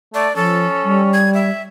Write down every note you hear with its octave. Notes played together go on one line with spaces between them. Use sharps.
A3 D5
F3 C#4 A4
G3
G#6
E5